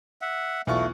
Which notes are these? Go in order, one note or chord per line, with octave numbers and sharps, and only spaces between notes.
E5 F#5
B1 E2 B2 A3 F4 C#6